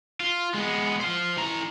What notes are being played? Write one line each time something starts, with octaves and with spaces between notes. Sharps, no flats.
F4
G#3 B3
C5 F5
E3 A#5